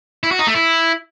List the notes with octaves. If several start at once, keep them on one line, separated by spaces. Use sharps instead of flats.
E4
F#4
D#4
A3
E4